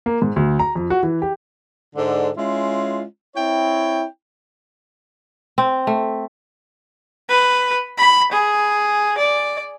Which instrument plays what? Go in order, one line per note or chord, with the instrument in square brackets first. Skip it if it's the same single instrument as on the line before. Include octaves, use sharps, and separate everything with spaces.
[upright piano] A#3
G#2
D2
A#5
F2
F#4
E3
G4
[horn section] G#2 D3
G#3 C#4 E4 F4
C4 E4 C#5 G5
[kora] C4
A3
[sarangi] B4
B5
G#4
D5